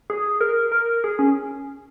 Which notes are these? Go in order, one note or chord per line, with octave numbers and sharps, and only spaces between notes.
G#4
A#4
A#4
G#4
C#4